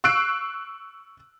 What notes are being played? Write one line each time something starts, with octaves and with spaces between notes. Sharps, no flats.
C#6 E6 F#6 C7 D7